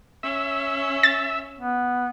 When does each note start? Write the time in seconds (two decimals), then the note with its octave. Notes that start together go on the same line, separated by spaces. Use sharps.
0.23 C#4 E5
1.03 A6
1.59 B3